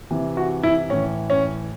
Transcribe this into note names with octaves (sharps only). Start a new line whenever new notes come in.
C3 E3
F#4
E4
A2 E3 C#4
C#4